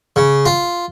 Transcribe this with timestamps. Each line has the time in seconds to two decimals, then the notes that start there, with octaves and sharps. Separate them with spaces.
0.16 C#3
0.46 F4